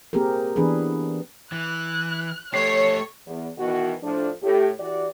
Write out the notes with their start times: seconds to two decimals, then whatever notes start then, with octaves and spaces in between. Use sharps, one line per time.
0.13 A#3 C4 G4 G#4 A#4
0.56 E3 B3 D4 G#4 B4
1.52 E3 F#6
2.54 A3 G4 C#5 C7
3.27 E2
3.58 B2 D#3 E3 B3 F#4
4.03 A2 F3 D4
4.42 A2 G4
4.80 E3 F#4 G4 D5